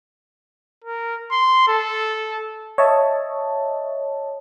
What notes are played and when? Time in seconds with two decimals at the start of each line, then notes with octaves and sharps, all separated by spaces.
0.84 A#4
1.32 C6
1.68 A4
2.78 C#5 D#5 E5 A5